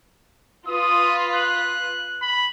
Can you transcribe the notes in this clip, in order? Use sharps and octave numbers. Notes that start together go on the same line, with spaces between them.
F4 B4 D#6
F#6
B5